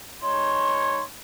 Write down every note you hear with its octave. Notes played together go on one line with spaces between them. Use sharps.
G#3 D#4 C#5 C6